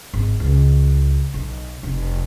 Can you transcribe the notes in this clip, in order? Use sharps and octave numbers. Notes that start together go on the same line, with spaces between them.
G#1
C#2
B1
F1